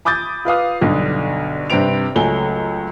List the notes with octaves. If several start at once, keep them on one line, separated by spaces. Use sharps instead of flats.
B5 D6 D#6 G6 A6
F4 B4 F5 D#6
B1 G2 D3
G2 C3 C4 B4 D7 F7
C#2 F#3 A3 G#5 G7